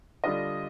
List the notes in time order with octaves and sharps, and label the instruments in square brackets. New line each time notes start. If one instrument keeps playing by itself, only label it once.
[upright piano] D3 G3 D4 F4 D#5